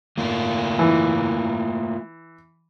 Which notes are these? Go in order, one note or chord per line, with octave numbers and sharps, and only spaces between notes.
A3 A#3 F4
E3